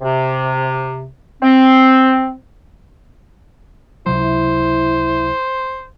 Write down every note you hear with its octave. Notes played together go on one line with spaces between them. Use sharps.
C3
C4
C#2 C3 F#3 E4 C5